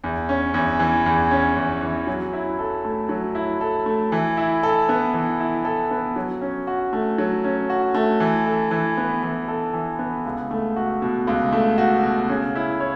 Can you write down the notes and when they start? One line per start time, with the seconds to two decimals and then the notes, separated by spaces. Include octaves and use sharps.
0.04 E2
0.29 C#4
0.54 E2
0.79 E3
1.06 E2
1.31 C#4
1.56 E2
1.82 E3
2.07 F#3
2.33 E4
2.59 A4
2.84 A3
3.09 F#3
3.35 E4
3.61 A4
3.86 A3
4.12 E3
4.37 E4
4.63 A4
4.89 B3
5.14 E3
5.40 E4
5.65 A4
5.91 B3
6.16 F#3
6.41 C#4
6.67 F#4
6.93 A3
7.18 F#3
7.44 C#4
7.70 F#4
7.94 A3
8.20 E3
8.46 A4
8.71 E3
8.97 B3
9.23 E3
9.48 A4
9.74 E3
9.99 B3
10.25 C#2
10.51 A3
10.76 F#4
11.02 B2
11.27 C#2
11.52 A3
11.78 F#4
12.03 B2
12.29 C#3
12.56 E4
12.80 C#5